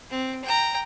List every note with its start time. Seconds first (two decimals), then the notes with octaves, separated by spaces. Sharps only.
0.10 C4
0.44 G5 A#5